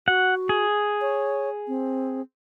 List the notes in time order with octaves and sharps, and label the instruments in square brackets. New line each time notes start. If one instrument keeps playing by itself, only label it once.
[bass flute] F#4 [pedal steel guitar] F#5
[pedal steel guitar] G#4
[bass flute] C#5
C4